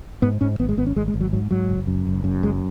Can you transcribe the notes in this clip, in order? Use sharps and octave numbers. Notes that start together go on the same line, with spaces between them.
G#2 B3
G#2 C#4
G#1 B3
G#3
G#1 B3
C#4
G#1 G#3
G#3
G#1
F#3
G#2 F#3
G#2 F#3
F#1
F#2
F#1
F#2
F#1 G#3